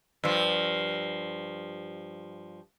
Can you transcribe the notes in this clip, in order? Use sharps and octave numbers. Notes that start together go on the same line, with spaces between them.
G2 F3